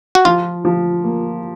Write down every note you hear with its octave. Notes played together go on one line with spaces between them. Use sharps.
F#4
F3 F4
F3
A#3